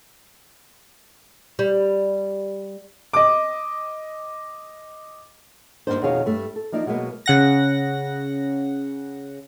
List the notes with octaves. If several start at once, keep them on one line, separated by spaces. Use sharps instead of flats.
G3
D#5 D6
G2 B2 A#3 D4 D#4 C5
F2 B2 D#3 G#4 C#5 F5
G2 A3
A4
F3 A#3 D#4 D5 E5
B2 F#3 G#3 A#3 B3
C#3 F#5 A#6